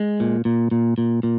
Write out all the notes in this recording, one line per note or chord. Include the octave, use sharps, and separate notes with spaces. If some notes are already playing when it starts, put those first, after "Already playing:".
Already playing: G#3
A#2
A#2
A#2
A#2
A#2